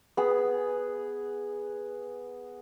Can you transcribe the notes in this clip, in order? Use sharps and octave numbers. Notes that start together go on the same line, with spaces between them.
B3 G#4